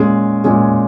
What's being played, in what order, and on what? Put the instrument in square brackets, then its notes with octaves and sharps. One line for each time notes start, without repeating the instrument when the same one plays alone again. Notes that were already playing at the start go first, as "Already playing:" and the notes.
Already playing: [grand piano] A#2 G#3 C#4 G#4
A#2 G#3 C#4 G#4